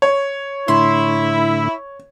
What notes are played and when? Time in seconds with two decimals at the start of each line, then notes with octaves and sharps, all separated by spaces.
0.02 C#5
0.68 A2 D3 E4 C6